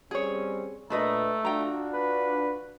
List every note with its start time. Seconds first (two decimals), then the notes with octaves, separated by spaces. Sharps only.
0.11 G3 C4 C#4 G#4 C#5
0.90 A#2 A3 D4 B4 D#5 A#5
1.45 D4 F4 F#4 G5 A#5
1.93 B4